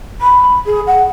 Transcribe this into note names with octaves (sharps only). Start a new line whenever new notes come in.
B5
G#4
F#5